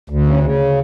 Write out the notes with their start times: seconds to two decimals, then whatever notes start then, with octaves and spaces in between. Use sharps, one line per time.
0.10 D2
0.27 C#3
0.43 C#3